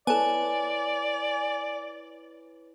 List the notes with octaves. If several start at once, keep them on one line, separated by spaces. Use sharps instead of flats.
B3 E4 A4 B4 C#5 D5 G#5